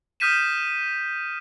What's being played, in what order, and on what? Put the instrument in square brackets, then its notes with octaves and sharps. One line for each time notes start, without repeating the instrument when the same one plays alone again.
[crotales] D#6 F6 G6 B6 D#7 E7